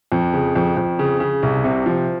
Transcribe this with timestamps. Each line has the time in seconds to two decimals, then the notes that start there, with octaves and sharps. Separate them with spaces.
0.12 F2
0.34 C#3
0.56 F2
0.77 F2
0.99 C#3
1.20 C#3
1.43 C2
1.64 C3
1.86 F3